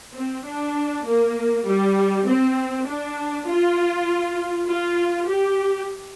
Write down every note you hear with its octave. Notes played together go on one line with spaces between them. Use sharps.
C4
D4
A#3
G3
C4
D4
F4
F4
G4